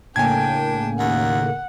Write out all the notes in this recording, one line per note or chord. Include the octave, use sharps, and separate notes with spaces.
A2 C#3 A#3 D4 G5 G#5 G#6
D#2 F#5